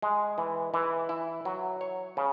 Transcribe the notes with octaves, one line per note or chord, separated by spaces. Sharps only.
G#3
E3
E3
E4
F#3
C#5
C#3